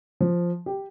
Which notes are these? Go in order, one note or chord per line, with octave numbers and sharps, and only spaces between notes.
F3
G4